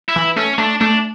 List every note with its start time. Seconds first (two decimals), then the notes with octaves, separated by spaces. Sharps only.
0.09 E4
0.16 E3
0.36 A3 C#4
0.58 A3 D4
0.81 A3 D4